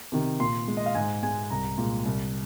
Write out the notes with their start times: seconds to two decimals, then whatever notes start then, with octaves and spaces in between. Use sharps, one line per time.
0.12 C3 D#3
0.39 A#2 C6
0.68 G#3
0.77 D#5
0.86 F5
0.95 G#2 G#5
1.23 G#3 G#5
1.50 C2 A#5
1.78 A#2 G#3
2.05 C2